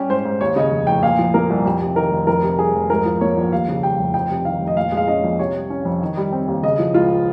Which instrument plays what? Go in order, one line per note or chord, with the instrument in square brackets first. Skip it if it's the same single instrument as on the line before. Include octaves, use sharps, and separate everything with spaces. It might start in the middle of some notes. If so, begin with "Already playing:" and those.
Already playing: [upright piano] G3 C#4 G4
G#2 C5
G#2
D#2 C#5
C#3 D#5
F1
F1 G5
A#2 F5
F3
A#3 A#4
C2
F2 G4
C3
D#3 A#4
F1
F2 A#4
C3
G3 G#4
F1
G#2 A#4
F3
A#3 C#5
A#1
D#2 F5
C#3
G3 G5
F1
F2 G5
C3
D#3 F5
F1
D#5
A#2 F5
G#3 F5
C#4 D#5
A#1
C3 C#5
G3
C#4
F2
D#3
G3
C4
D#2
C#3 D#5
F3
C#2 F4